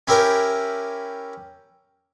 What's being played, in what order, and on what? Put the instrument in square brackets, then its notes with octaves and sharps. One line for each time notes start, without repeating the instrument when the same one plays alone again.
[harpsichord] C#4 E4 G4 A#4